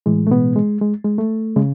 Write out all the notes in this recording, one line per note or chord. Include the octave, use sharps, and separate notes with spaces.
A2 E3 G#3
A3
B2 B3
G#3
G#3
G#3
A3
C#3 G#3